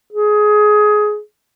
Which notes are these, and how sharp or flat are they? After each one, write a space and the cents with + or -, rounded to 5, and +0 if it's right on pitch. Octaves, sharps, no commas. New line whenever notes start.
G#4 +15